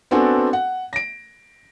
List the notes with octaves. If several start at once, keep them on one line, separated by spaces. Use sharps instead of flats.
B3 C4 D4 F#4 A4 G#5
F#5
A#6 D7